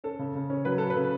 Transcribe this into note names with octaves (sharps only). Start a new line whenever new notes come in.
C#4 A4
C#3
C#3
C#4
F#3 B4
F#3 A4
B4
C#3